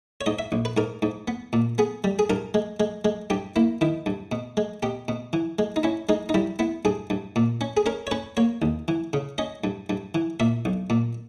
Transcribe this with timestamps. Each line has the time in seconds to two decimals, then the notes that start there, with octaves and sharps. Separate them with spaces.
0.21 C#5
0.26 G#2 D#5
0.39 E5
0.52 A#1
0.65 B4
0.77 G#2 A#4
1.02 G#2
1.28 B3
1.53 A#2
1.78 B3 G#4
2.04 G3
2.19 G#4
2.30 G2 A#4
2.54 G#3
2.80 G#3
3.05 G#3
3.30 G2 G4
3.56 A#3 E4
3.81 D#3 E4
4.06 G2
4.32 B2
4.57 G#3
4.83 B2 G4
5.08 B2
5.33 E3
5.59 G#3
5.76 D#4
5.83 C#4 E4
6.09 G#3 D#4
6.29 D#4
6.34 G3 E4
6.59 B3 E4
6.85 G2 G#4
7.10 G2
7.36 A#2
7.61 C#4
7.77 G#4
7.86 C#4 A#4
8.07 C#5
8.11 C#4 B4
8.37 A#3 C#5
8.62 D#2
8.88 E3
9.13 C#3
9.38 C#4 D#5
9.64 G2
9.90 G2
10.15 E3
10.40 A#2 E5
10.65 B1
10.90 A#2